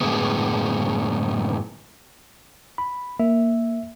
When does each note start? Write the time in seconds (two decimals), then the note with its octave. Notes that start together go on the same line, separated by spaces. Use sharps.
0.01 F#2 A2 D3 G#3 B3
2.78 B5
3.19 A#3 E5